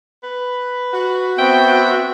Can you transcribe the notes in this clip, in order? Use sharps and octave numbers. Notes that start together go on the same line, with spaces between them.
B4
F#4
B3 C4 E5 G5